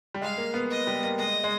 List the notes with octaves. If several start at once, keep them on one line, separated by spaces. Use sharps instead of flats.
G3
G#3 F5
A#3
B3
D#5
G3
A#3
G#3 D#5
G#3